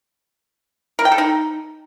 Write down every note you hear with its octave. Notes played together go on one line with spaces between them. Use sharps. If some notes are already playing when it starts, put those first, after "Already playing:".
A#4
G5
A4
D#4